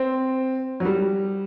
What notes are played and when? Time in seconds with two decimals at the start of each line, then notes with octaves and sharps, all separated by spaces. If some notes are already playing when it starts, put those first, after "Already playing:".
Already playing: C4
0.80 F#3
0.85 G3